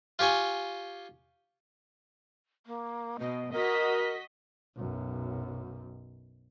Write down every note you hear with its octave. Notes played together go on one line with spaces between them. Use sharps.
F4 G4 C#5 G#5
A#3
B2 D#5
F#4 A#4 D#5 B6
B1 F#2